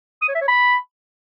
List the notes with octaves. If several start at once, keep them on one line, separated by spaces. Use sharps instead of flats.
D#6
C#5
E5
C#5
B5